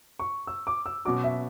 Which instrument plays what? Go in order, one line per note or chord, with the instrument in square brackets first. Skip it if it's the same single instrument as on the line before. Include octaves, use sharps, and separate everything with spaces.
[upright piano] C#6
E6
D6
E6
[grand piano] B2 F#3 C#4 F#4 [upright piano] D6
[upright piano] E5